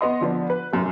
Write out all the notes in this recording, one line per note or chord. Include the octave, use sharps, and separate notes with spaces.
B3 D#5 C6
D3 F3 B3 D4
B4
F1 F#2